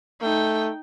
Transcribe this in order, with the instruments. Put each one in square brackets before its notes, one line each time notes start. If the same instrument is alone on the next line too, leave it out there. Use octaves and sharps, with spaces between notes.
[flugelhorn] A3 [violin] D#4 G5